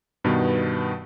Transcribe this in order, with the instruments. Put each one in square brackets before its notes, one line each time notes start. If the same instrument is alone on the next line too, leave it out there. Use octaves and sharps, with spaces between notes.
[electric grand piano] G2 B2 D#3 B3